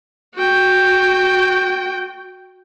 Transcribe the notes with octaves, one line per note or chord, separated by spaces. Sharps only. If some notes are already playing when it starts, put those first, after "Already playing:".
F#4 G5